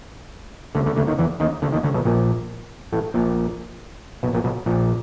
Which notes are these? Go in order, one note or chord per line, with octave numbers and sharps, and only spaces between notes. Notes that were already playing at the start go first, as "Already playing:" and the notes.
D2 D3
D2 D3
D2 D3
D#2 D#3
E2 E3
D#2 D#3
D2 D3
D#2 D#3
D2 D3
B1 B2
A#1 A#2
A1 A2
A#1 A#2
B1 B2
A#1 A#2
B1 B2
A#1 A#2